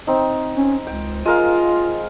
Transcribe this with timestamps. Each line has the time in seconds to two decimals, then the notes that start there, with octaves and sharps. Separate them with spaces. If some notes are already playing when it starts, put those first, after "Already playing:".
0.07 C4 D#4
0.57 C#4
0.87 C#2 G5
1.25 G#3 F4 A#4 F5